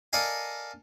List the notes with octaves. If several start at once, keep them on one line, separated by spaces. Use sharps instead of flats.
A4 A#4 D5 D#5 F5 G#5